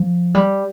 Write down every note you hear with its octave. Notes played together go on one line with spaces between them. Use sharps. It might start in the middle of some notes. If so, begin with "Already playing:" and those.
Already playing: F3
G3